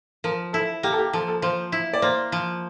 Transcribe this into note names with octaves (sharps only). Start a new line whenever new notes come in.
F3 A#4
E4 A4
A#3 G4
A4
G4
F3 A4
A4
F3 C5
E4
D5
A#3 C5
F3